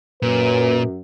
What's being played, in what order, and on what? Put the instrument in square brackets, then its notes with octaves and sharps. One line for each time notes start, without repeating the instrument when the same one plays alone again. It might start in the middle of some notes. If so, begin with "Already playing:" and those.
[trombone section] F#2 [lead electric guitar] A#2 [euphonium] B4